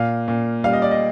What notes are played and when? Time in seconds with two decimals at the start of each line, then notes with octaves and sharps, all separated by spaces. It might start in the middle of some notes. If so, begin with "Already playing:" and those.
Already playing: A#2 F5
0.28 A#2
0.64 G3 F5
0.73 D#5
0.82 D5
0.91 D#5